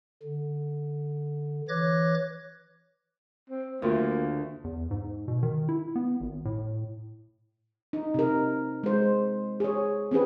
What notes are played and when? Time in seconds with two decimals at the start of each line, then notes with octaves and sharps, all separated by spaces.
0.23 D3
1.69 E3 C#5 D6 F#6 G#6 A#6
3.50 C4
3.82 D2 A3 A#3 F4 F#4
4.64 E2
4.91 G#2
5.28 B2
5.43 D#3
5.69 E4
5.96 B3
6.21 G#1
6.45 A2
7.93 D#4
8.14 C3 A#4
8.83 G#3 C5
9.60 G#4 C#5
10.11 C4 C#4 G#4 B4